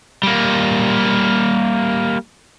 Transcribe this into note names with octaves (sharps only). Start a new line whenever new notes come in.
G3 A#3